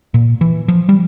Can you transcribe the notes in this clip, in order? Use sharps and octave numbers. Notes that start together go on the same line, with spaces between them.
A#2
E3
F3
G3